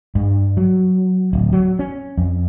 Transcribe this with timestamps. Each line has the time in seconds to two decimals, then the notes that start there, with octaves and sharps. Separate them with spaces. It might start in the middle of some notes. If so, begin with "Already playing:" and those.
0.15 G2
0.57 F#3
1.33 D1
1.53 F#3
1.79 C#4
2.17 F2